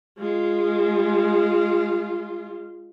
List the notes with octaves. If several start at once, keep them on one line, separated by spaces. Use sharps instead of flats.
G#3 F4